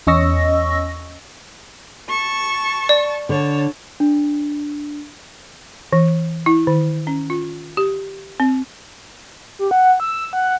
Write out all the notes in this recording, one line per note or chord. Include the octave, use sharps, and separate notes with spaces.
E2 C#4 D#5 C#6 E6 A#6
A5 C#6
D5
D3 C#5 A5
D4
E3
E4
D#3
C#4
F4
G4
C4
G4
F#5
E6
F#5